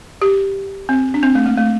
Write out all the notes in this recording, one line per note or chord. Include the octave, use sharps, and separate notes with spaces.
G4
C4
D4
C4
A3
A#3
A3